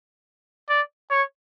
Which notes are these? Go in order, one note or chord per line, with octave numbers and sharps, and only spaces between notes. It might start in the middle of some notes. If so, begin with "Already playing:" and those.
D5
C#5